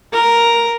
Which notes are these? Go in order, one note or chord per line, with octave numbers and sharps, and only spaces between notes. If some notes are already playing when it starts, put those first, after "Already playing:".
A#4